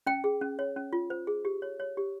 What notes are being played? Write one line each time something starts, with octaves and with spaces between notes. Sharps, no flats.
C#4 G5
G#4
C#4
C#5
C#4
F4
C5
G#4
G4
C#5
C#5
G4